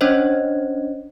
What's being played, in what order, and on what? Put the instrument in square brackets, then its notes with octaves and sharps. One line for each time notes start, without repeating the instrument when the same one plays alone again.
[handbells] C#4 D4 C5 C#5 D#5